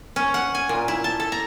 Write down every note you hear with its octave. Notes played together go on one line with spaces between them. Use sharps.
C#4
F#5
G#5
A#2
E4
A5
A4
A#5